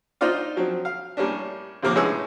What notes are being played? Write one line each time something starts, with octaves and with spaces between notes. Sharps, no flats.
D#4 F4 C5 D5 F5
F3 F#3 C4
F5
A2 G3 A#3 C#4 D4
A1 F2 C3 A#3 A#4 D6
A2 G#3 B3 C#4 G#5 E6